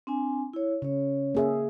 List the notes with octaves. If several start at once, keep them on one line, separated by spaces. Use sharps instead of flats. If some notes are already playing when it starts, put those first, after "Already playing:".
C4 D4 G#5
E4 C#5
C#3 C#4 C#5
A#3 G#4 E5